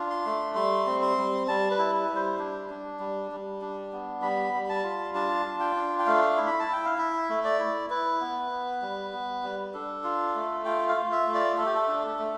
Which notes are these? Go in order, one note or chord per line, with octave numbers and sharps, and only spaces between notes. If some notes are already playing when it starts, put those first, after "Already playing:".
Already playing: D4 F4
C6
A3
G3 C6
C4
C6
G3
G3 A5
B4
E4
G3
C5
D4
D4
G3
G3
D4
B3
G3 B5
G3
B5
A5
F4
D4 A5
F4
G5
D4
G5
A3 F5
E4
B5
A5
E4 G5
F5
E4 E5
A3
D5
E4
E4 B4
B3
B3
G3
B3
G3
D4 A4
F4
A3
F4 G5
F5
F4
E5
A3
D5
A3 A4
G4
A4
D4
A3